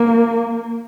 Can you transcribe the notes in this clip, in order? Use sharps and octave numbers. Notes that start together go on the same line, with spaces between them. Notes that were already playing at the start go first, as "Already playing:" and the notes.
Already playing: A#3